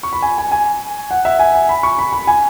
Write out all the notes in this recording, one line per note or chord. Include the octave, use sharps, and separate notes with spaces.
C#6
B5
G#5
G#5
G#5
F#5
E5
G#5
G#5
B5
C#6
B5
B5
G#5